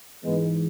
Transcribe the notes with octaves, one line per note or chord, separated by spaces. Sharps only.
G#2 E3 G#3 B3